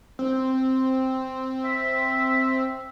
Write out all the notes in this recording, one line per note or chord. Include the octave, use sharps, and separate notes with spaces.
C4
E5